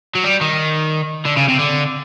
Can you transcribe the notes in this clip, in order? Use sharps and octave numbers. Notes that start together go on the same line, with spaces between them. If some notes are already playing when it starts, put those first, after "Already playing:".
F#3
G3
D#3
D3
C#3
C3
D3